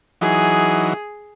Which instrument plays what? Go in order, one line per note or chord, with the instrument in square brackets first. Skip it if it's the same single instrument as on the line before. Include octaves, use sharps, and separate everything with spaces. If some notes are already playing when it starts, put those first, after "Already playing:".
[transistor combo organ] E3 F#3 D#4 [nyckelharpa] G#4